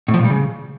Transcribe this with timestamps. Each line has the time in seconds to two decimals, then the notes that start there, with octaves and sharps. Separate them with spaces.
0.08 A2
0.14 F3
0.19 A#2
0.25 G3
0.30 C#3